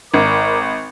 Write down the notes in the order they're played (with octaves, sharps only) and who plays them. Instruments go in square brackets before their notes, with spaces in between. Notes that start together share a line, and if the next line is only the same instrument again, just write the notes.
[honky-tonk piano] G#1 [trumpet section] A#4 D5 D6